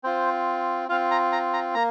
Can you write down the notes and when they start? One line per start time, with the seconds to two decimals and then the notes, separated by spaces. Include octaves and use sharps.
0.04 C4 F4 C5
0.89 C4 F4 F5
1.11 A#5
1.32 A#5
1.53 A#5
1.75 A#3 A#5